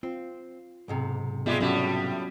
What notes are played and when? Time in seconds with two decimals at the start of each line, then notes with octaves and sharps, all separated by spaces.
0.03 C4 F4
0.88 B1 G#2 C3
1.46 G3 G#3 B3 F4 G4 E5
1.60 A2 F#3 G3 C#4 F#4